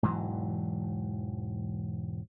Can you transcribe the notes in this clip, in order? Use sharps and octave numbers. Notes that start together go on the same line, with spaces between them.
E1 G#2 E3 F#3